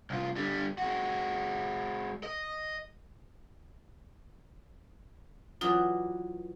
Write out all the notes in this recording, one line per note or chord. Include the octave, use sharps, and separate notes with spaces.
C2 F4
D3 G3
G#3 F#4
D#5
E3 F#3 F4 D5 D#6